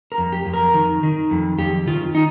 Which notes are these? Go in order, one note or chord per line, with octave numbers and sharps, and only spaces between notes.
A#4
F2
G4
F2
A#4
D#3
D#3
F2
F2 G4
D#3 F4
D#4